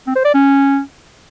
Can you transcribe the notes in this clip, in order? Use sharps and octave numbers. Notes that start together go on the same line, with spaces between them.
C4
C5
D5
C#4